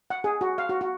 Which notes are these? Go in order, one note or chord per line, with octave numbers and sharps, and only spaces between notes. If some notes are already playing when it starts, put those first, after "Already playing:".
F#5
G#4
F#4
F5
F#4
F#4